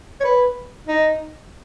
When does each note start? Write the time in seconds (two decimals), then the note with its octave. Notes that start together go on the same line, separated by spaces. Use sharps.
0.21 C#5
0.24 B4
0.87 D#4